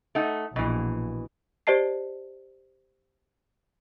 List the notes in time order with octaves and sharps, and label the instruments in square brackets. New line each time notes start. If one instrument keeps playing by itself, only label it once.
[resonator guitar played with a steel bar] A3 D#4 F#5
[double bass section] A#1 [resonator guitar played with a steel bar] B2 E3
[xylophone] G4 C5 D5 D#5 A5 C7